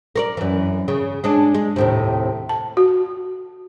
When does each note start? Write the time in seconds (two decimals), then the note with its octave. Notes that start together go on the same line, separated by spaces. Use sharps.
0.16 A#4 C#5 D5
0.37 F#2 E3
0.88 C#3
1.24 G#3 C#4 D4
1.55 G#3
1.76 D#2 A2 C3
2.49 A5
2.77 F#4